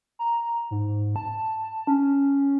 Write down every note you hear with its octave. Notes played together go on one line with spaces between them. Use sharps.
A#5
G#2
A5
C#4